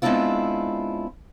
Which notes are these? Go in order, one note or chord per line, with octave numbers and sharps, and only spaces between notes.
G#3 B3 C4 D4 E4 F4